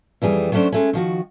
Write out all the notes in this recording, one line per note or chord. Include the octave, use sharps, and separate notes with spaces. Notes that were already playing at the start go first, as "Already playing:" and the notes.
F2 E3 G3 G#4
F#3 G3 A3 C#4 D4 C5
G#3 A3 C#4
D#3 F3 F#4